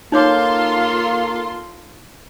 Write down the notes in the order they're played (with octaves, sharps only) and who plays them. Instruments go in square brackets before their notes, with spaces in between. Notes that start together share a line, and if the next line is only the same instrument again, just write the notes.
[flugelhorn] A#3 [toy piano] D#4 C#5 D6 [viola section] F4 A4 C6